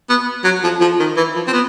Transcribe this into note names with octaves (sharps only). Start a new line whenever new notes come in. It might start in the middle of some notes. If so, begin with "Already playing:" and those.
B3
F#3
F3
F3
D#3
E3
F3
C4
B3